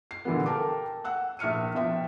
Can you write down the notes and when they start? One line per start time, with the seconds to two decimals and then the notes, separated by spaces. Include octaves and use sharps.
0.11 C7
0.25 A#2 D3 E3 G3 B3
0.46 A4 A#4 G5 A5 D6
1.04 F#5 E6 F#6
1.39 A#1 E5 F6 C#7 D#7
1.75 B2 F3 E5 G5